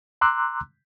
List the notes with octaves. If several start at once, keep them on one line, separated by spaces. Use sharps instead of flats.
A#5 C6 D6 E6 F#6